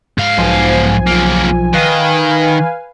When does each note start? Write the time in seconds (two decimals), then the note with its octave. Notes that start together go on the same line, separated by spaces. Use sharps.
0.18 G#2 F5
0.37 B1 F3 G#5
1.07 C#2 A#3
1.73 D#3 B4 F5 G#5